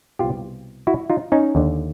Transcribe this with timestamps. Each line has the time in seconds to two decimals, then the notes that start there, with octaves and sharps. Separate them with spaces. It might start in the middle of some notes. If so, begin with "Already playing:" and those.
0.19 C2 B2 F4 G4
0.87 E4 F#4
1.10 D#4 F4
1.32 C#4 D#4
1.55 D#2 D3